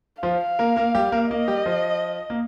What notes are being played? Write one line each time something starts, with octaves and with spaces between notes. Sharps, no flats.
F3 F4 F5
A#3 A#4
A#3 A#4
G3 G4
A#3 A#4
A#3 A#4 D#5
G3 G4
F3 F4
A#3